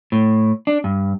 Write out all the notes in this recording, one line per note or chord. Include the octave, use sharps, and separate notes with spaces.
A2
D4
G2